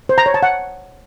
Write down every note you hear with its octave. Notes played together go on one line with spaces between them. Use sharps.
C5
A#5
C#5
A5
F#5